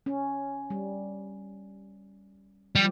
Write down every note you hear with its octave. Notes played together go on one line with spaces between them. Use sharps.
C#4
G3
F3 G3 G4